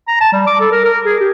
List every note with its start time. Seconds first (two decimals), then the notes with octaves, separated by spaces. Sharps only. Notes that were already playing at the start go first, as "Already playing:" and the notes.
0.07 A#5
0.21 A5
0.33 G3
0.47 D6
0.60 A4
0.71 A#4
0.85 A#4
1.05 G#4
1.19 G4